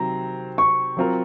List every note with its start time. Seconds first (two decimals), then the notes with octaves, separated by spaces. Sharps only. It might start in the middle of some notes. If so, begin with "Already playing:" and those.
Already playing: C3 D#3 F#3 C4 A#5
0.58 C#6
0.97 F#3 C4 F4 A#4